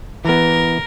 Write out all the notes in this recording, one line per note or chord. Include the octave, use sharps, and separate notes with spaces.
E3 B3 A#4